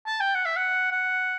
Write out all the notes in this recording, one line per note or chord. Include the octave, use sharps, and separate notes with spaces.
A5
G5
F#5
E5
F#5
F#5